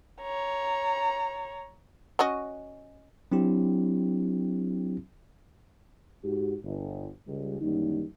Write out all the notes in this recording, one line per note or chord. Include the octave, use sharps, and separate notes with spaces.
C#5 A#5
C#4 F#4 D#5
F#3 C4 D4 E4 G4
G#2 F#4 G4
G1
C#2 G3
F#2 D#3 E3 G3 A#3 D#4